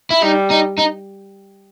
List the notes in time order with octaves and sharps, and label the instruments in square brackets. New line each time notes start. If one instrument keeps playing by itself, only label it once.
[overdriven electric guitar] E4
[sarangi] G3 [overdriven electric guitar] D#4
[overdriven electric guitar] D#4
D#4